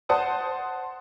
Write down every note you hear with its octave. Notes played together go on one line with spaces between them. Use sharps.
C5 F#5 A5 D#6